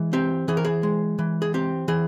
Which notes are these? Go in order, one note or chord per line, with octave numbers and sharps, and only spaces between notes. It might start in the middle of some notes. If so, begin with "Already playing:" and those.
Already playing: E3 G#3
C4 G4
E3 G#4
A#4
G#4
G#3
E3
G#4
C4 G4
E3 G#4